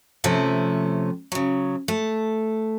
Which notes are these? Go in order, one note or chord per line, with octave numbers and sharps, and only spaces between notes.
C3 F3 A3 C#4
C#3 F#3
A3